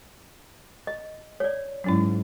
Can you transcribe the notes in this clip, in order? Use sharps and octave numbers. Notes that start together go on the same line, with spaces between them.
D#5
C#5 D5
G#2 F#3 C#4 E4